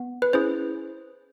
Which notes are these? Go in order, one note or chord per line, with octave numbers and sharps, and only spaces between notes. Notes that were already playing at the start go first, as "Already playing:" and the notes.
Already playing: B3
B4
C#4 E4 G#4 C5